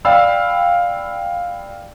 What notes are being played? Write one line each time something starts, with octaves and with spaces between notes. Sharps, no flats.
D5 F5 G5 B5 E6